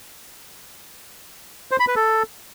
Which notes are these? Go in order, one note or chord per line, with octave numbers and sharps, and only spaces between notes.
C5
B5
B4
A4